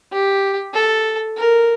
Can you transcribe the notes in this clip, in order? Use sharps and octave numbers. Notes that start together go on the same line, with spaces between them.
G4
A4
A#4